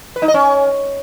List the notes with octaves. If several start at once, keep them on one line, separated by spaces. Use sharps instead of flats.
B4
D#4
D#5
C#4